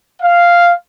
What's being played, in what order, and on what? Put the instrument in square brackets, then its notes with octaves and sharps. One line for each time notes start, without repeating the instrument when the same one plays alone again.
[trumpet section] F5